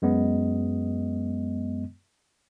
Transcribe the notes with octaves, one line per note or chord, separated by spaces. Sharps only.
F#2 G#3 B3 D#5